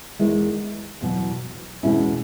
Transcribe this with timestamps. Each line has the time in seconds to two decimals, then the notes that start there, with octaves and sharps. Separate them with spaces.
0.19 E2 D#3 G#3 B3 E4
1.01 E2 B2 F#3
1.83 E2 B2 G#3 C#4 E4